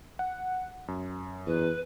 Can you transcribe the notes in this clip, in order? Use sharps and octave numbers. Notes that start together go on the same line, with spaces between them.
F#5
F#2
E2 B4